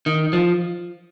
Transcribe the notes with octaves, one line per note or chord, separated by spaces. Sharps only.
D#3
F3